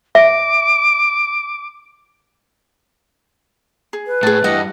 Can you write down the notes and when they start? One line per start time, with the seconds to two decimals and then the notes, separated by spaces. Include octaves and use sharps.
0.15 E5 D6
3.93 G#4
4.07 B4
4.23 A2 G#4 A5
4.44 G2 E3 D#5 F#5